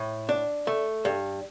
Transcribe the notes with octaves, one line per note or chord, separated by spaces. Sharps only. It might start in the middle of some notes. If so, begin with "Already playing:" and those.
Already playing: A2
D4
A3
G2